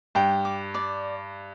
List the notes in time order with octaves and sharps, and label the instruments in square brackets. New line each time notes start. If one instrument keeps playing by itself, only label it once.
[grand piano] G2 [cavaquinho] G5
[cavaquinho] D6
D5